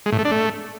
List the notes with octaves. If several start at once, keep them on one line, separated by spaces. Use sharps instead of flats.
G#3
A2
A3
D4
A3